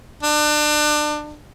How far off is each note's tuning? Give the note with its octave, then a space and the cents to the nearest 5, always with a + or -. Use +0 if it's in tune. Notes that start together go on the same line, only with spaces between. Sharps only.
D4 +30